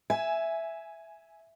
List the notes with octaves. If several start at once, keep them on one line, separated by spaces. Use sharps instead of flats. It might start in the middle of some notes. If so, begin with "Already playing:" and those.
E5 G#5